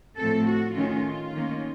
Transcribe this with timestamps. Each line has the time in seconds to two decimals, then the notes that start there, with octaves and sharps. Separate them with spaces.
0.19 A2 F3 A3 C4 A4
0.47 F#4
0.76 D#3 A3 C#4 F4
1.34 D#3 A#3 C#4